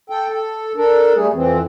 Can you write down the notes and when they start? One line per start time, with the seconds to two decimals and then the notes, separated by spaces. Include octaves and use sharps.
0.10 A4 G5
0.28 A4
0.76 D4 A4 A#4
1.15 G3 A3 G#4
1.34 F2 E3 C4